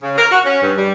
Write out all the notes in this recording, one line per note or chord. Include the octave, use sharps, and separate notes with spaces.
C#3
A#4
F#4
C#4
G2
G3